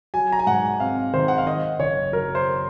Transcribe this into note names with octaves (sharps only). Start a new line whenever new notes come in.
F#3 G#5
A#5
G#5
G#2 F#5
C4 F5
D#3 C5
F#5
F5
D#3 D#5
F#1 C#5
F#3 A#4
C5